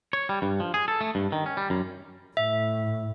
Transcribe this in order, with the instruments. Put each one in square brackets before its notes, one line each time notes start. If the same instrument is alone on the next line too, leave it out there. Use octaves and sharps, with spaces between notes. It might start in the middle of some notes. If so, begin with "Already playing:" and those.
[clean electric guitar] C#5
G3
G2
F3
G#4
A4
A3
G2
D#3
C#4
G3
F#2
[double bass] A2 [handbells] E5